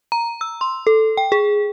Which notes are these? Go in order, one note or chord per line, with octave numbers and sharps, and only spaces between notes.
A#5
E6
C6
A4
G5
G#4